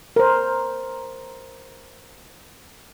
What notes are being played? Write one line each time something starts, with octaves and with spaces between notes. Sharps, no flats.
A#4 C5